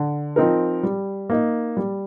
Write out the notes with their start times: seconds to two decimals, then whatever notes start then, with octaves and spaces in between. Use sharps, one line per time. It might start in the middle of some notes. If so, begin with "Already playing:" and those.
Already playing: D3
0.36 F3 C4 D#4 A#4
0.83 G3
1.30 A#3 D#4
1.77 G3